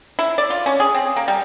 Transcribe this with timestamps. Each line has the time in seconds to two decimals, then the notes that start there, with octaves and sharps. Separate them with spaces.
0.19 E4
0.38 D5
0.50 F4
0.66 C#4
0.80 G#4
0.94 C4
1.16 A#3
1.28 G3